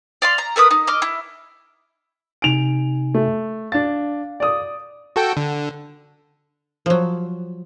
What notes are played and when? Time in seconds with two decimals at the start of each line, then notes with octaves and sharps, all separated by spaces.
0.22 D5 F5 C6
0.38 A#5
0.56 A3 A#4 B4 D#6
0.71 D#4
0.87 D#5 D6 F6
1.02 E4
2.42 C3 D#4 G#5 D7 F7
3.14 A3
3.72 D4 F5 A6
4.40 D5 D#6
5.16 F#4 A4 G5
5.37 D3
6.86 F3 F#3